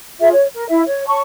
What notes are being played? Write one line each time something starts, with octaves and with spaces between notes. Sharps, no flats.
F4 G#4 E5
C#5
A#4
E4 E5
C#5
C#5 A5 C#6